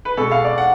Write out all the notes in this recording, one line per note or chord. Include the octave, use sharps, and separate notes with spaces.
B4
B2 G#3 A4
F5
D5
F#5